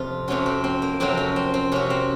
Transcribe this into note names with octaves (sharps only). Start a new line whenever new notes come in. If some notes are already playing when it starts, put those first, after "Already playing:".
Already playing: F2 C3 F4
F2 C3 F#3 C#4
C4
C4
A#3
F2 C3 F#3 C4
C#4
C4
C4
C3 F#3 C#4
C4